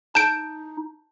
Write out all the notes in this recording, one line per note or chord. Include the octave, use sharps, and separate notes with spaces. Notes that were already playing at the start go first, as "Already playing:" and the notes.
D#4 A5 G6 D7